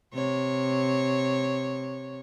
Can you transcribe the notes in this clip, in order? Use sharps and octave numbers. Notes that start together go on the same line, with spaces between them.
C3 C#5